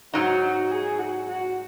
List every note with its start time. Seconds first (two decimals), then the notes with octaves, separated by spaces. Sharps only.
0.14 G#2 F#3 D#4 F#4
0.71 G#4
0.99 F#4
1.28 F#4